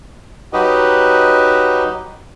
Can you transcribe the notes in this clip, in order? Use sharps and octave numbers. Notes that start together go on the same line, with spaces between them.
F#3 D#4 F#4 G4 B4 D#5